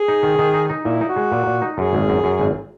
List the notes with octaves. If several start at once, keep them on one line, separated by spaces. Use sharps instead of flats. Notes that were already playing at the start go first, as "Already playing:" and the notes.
Already playing: G#4
D#4
D#3
D#3
D#4
D#4
A#2 E4
D#4
F#4
G#3
A#2
A#2
D#4
F#2 G#4
G#1
F#2
F#2
G#1